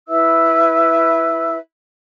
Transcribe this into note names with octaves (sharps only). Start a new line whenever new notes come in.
E4 B4 E5 E6